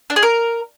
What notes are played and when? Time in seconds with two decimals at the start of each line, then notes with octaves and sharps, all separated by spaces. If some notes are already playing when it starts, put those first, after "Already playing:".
0.10 D4
0.16 G#4
0.23 A#4